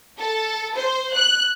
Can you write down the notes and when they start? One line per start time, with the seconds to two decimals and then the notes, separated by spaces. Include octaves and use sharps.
0.18 A4
0.75 C5
1.14 F#6